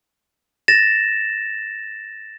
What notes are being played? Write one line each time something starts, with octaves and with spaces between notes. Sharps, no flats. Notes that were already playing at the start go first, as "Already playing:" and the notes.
A6 A#6 E7